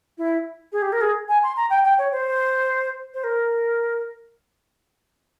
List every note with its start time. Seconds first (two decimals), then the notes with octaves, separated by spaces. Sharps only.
0.17 E4
0.72 G#4
0.82 G4
0.92 A#4
1.01 G#4
1.28 G#5
1.43 C6
1.56 A#5
1.70 G5
1.84 G5
1.98 C#5
2.11 C5
3.14 C5
3.23 A#4